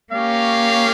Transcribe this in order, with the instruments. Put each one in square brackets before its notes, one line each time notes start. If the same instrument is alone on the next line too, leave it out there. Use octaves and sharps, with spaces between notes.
[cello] A#3 [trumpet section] C#4 G4 C#5 F5